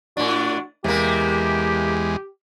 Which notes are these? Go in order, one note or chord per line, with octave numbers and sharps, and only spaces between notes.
A2 D4 F#4
E2 C3 G#3 A#3 G4